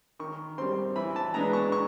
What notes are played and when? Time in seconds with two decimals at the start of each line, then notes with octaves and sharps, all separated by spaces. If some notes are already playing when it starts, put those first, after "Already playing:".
0.19 D#3 C#6
0.58 G3 C4 C6
0.96 E3 B5
1.16 A5
1.34 G#3 B3 D4 A#5
1.53 C#6
1.72 C#6